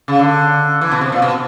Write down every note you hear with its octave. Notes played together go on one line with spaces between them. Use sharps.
C#3
D3
E3
B2
C3
A#2
B2